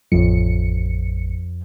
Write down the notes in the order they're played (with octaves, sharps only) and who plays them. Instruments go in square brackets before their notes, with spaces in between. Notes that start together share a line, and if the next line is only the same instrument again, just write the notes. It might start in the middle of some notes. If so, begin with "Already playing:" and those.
[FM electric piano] A1 C#7 [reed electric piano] F2